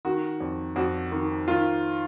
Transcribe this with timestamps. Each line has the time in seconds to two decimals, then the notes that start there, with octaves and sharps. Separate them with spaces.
0.05 D#3 F#4
0.40 F2
0.76 F2 F#4
1.12 D#3
1.48 D#3 F4